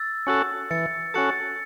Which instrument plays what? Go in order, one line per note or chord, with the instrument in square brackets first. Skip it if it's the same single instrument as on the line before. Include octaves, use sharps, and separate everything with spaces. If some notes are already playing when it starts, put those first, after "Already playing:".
Already playing: [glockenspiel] E6 A6
[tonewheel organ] C#4 F#4 A4
[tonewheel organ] E3 [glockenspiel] A6 C#7
[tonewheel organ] C#4 F#4 A4 [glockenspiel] A6 C#7